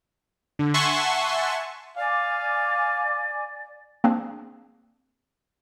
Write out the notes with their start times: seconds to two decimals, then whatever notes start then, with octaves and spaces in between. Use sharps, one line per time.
0.59 D3
0.74 E5 F#5 G#5 A5 C6 C#6
1.97 D5 F5 G#5 D6
4.04 A#3 C4 D4 G#4